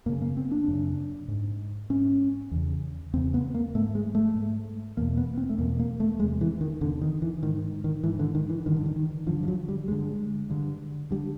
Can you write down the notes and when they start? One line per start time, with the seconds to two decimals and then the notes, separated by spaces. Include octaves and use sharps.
0.06 F#2 C#3 A#3
0.22 A#3
0.37 C4
0.51 D4
0.68 F#2 C#3
1.28 G#2
1.90 G#2 C#4
2.51 E2 C#3
3.13 E2 C4
3.17 C#3
3.34 B3
3.54 A#3
3.75 G#2 A3
3.95 G#3
4.15 A3
4.35 G#2
4.97 E2 B2 A#3
5.17 B3
5.38 C4
5.49 A3
5.58 E2 B2 A#3
5.79 A#3
6.00 A3
6.20 E2 C3 G#3
6.41 E3
6.61 D#3
6.81 E2 D3
6.84 C3
7.01 D#3
7.22 E3
7.43 G#2 D#3
7.84 D#3
8.04 G#2 E3
8.19 D3
8.35 D#3
8.50 E3
8.66 G2 D3 D#3
8.76 D3
8.86 D#3
8.96 D#3
9.27 G2 D3 F3
9.43 F3
9.48 F#3
9.69 G3
9.88 G2 D3 G#3
10.50 G2 D3
11.11 D3 G3